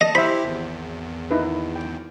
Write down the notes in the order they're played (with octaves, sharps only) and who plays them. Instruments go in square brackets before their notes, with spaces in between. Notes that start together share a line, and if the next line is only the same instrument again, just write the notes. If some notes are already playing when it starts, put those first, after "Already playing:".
[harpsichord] D#5 [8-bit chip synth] A5
[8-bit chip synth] E4 G4 [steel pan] C5 E5 [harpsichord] B5
[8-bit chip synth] G#1 E2
[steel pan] D#4 E4 B4
G5